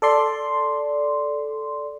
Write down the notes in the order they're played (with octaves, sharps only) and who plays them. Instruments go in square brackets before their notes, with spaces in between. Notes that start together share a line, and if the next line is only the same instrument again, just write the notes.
[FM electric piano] A4 D5 C6